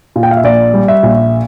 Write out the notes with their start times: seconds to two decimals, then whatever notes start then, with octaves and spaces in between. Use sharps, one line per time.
0.16 A#2
0.23 G5
0.31 F5
0.37 E5
0.44 A#1 D5
0.74 G3
0.88 E5
1.03 A#1